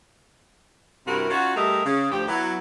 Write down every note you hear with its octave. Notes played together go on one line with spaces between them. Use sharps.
G2 C3 E4 F#4 A#4
C#4 D#4 F4 F#4
G3 A3 G#4 A#4 D#5 E5
C#3
D2 F3 G4
F#3 B3 E4